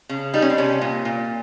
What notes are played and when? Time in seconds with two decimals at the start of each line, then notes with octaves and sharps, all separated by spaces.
0.09 C#3
0.34 G3 D#4
0.42 C#4
0.50 C4
0.58 C3 C#4
0.81 A#2
1.05 A#2